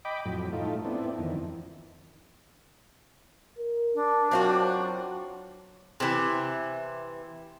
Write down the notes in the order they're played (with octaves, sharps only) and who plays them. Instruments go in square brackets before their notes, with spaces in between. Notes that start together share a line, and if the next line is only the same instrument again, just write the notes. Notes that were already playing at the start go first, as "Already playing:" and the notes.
[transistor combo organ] D#5 G5 B5 D6
F2 A2 F#3
A2 A3 D#4 F4
B3 C4 D4 E4
F2 D#3 E3
[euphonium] A#4
[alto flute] D4
[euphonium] F#3 [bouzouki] C4 F4 F#4
[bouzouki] C3 E3